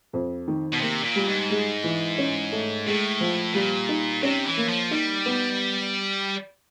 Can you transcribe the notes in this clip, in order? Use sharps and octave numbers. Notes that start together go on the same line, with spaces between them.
F2
D#3
B2
C3 A#3
A#2
G3
G#2
G#3
E3
C#4
A3
A2 G#3
F3
A#2 G3
D#4
C3 C#4
E3
A#3
F3
G3 D#4
B3